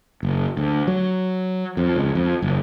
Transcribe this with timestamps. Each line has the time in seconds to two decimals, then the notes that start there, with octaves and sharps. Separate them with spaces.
0.23 F#1
0.57 D2
0.87 F#3
1.77 F2
1.96 C#2
2.15 F2
2.42 F#1